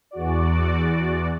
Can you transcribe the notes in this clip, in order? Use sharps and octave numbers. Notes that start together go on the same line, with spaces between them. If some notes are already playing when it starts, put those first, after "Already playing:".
E2 F#4 D5